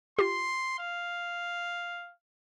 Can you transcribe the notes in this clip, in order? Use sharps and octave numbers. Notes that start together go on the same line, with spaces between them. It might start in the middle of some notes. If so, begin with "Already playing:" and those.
F4 G4 C6
F5